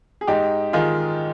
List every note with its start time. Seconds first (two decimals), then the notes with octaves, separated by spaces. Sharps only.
0.21 G#4
0.27 G#2 D#4 G4
0.73 D#3 F4 G#4